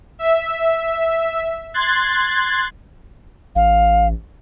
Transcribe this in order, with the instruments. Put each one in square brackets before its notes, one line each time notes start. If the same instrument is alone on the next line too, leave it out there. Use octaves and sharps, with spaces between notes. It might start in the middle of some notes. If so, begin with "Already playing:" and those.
[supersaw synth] E5
C6 F#6 G#6 A6
[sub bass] A1 [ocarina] F5